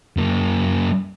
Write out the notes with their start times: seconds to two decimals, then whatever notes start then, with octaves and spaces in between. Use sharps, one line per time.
0.17 F#2 A#3